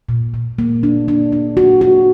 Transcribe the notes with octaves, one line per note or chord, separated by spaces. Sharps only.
A#2
A#2
A#3
D4
D4
D4
F#4
F#4